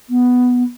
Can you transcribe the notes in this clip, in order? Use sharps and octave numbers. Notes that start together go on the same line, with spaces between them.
B3